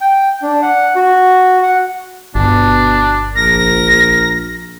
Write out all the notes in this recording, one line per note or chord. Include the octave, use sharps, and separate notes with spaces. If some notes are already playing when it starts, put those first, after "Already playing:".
G5
D4
F#5
F#4
F#5
G1 B2 D4
A#1 A#4 A#6